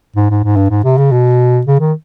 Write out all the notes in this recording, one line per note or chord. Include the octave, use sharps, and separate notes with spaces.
G#2
G#2
G#2
G2
G#2
C3
C#3
B2
C#3
D#3